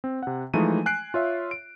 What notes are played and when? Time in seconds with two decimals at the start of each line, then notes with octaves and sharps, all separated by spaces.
0.04 C4
0.23 C3 F#5
0.54 E3 F3 G#3 A3 D#4 D#7
0.86 G#5 F#6 C7 D7
1.14 F4 C#5 E5
1.51 D7